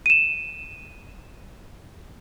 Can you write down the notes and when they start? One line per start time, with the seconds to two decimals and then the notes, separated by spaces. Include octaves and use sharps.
0.06 D#7 E7